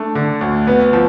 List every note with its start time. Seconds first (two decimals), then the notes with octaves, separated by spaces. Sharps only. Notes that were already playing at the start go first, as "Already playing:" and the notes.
Already playing: A3 D4
0.15 D3
0.41 D2
0.67 B3
0.93 F3